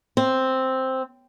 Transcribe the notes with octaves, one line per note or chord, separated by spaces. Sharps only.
C4